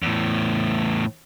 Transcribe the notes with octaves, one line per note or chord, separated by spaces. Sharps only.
E2 A2